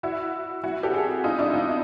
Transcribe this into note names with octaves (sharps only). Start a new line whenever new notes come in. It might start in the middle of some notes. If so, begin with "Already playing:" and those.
E4 F#4
E4 F#4
G4 A4
F#4 G#4
D#4 F4
D4 E4
D#4 F4
E4